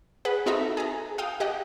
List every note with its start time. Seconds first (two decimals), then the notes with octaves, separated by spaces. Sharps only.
0.25 G#4 B4 F#5
0.46 C4 D#4 F#4 A4 E5 A#5
0.77 G#4 A5 A#5
1.18 F5 G5 D#6
1.40 G4 D#5 F#5 G5